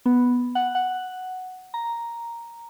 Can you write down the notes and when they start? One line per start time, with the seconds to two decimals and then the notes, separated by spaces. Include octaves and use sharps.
0.06 B3
0.55 F#5
0.75 F#5
1.74 A#5